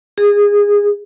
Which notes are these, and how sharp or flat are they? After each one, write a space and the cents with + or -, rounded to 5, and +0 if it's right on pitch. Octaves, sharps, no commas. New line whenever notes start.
G#4 -20